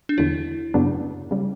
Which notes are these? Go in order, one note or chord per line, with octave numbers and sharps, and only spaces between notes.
D4
E2 D3 F#3 E4
F#2 C#3 F#3 B3 D4
C#3 G3